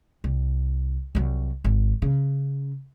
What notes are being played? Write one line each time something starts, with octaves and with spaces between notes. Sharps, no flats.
C2
C2 F#3
G#1
C#3